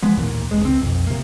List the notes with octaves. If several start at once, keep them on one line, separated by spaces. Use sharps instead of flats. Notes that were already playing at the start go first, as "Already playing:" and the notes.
F3 G#3 B3
A1 D#2 A#2
F1 G#3
C#2 C4
B1 F2
C3 A#3